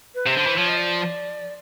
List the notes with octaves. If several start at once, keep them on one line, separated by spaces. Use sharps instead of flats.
B4
C3 C5
D3
E3
F3 C#5
D#5
D5